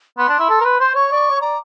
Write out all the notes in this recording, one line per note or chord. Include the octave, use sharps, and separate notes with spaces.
B3 C6
D4
E4
A4
A#4
B4
C5 C6
C#5 C#6
D5
C#5
D5 A#5